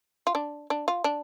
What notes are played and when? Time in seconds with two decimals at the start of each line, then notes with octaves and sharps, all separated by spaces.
0.27 F4
0.35 D4
0.70 D4
0.88 F4
1.04 D4